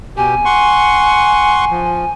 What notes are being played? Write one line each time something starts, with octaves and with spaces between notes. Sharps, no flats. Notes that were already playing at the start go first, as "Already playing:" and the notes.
B2 G4 G#5
F#5 C6 C#6
F3